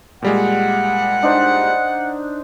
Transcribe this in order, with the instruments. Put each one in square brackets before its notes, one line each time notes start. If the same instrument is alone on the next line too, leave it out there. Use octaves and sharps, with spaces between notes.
[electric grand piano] A#2 G3 G#3 [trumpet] F#5
[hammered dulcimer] D4 D#4 C5